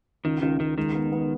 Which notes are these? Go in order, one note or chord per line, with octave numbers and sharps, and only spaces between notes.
C#2 D#3
C#2 D#3
C#2 D#3
D#3 G#3
B3
B3